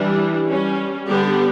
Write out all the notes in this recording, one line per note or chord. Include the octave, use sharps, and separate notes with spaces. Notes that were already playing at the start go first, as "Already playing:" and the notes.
Already playing: E3 G3 D4
G3 C#4
D3 G3 B3 D4 G4